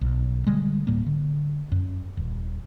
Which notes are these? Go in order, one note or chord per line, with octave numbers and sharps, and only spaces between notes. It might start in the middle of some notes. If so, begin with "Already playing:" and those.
B1
D3 G3 G#3
D1 A2 G3 A#3
D3
F#2
D#1